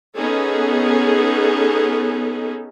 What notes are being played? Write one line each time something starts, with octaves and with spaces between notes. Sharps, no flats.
B3 C#4 D#4 G#4 A4